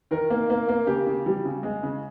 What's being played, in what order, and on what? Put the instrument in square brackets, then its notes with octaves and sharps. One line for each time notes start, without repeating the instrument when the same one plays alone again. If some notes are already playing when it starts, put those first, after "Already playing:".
[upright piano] D#3 A#4
A#3
A#3
A#3
C#3 G4
C#3
G3
C#3
G#3
C#3